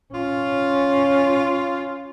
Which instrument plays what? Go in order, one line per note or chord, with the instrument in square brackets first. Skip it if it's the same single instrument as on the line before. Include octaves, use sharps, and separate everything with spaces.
[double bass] C#4 [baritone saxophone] F4